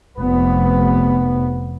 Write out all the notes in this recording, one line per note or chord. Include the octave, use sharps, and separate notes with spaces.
F1 B3